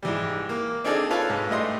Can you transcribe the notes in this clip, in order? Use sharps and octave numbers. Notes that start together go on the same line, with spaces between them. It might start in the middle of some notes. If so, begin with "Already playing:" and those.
G#2 E3 G3
A#3
C4 D4 D#4 G#4 A4
F4 A4 B4 C#5 F5
G#2
A2 G3 A3 D#5 C6